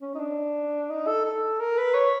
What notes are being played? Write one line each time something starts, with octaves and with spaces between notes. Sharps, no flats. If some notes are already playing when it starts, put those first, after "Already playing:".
C#4
D#4
D4
D#4
A4
A4
A#4
B4
C#5